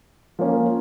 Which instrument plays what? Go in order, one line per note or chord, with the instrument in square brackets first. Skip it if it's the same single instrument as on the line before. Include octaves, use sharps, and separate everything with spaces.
[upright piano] F3 A#3 C#4